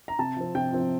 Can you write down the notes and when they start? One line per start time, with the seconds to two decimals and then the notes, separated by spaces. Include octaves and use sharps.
0.08 A#5
0.19 C3 A5
0.36 F3 C4
0.55 C3 G5
0.72 F3 C4